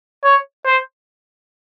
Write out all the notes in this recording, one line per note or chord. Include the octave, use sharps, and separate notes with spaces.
C#5
C5